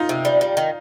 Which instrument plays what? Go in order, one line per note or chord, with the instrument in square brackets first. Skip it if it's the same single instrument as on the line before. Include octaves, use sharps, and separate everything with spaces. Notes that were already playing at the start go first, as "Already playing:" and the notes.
Already playing: [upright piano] D#4 F4
[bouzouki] C3
G3
G3
D#3